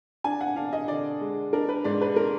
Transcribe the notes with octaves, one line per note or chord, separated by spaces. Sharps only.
D4 G#5
F#5
D4 F5
D#5
D3 D5
G#3
D4 A#4
B4
G#2 D5
B4
D4 A#4